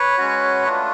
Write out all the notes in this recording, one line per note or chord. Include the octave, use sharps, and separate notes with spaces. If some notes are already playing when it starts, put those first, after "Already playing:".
Already playing: B4 C#5
G#3 C#4 F#4
A3 D4 F4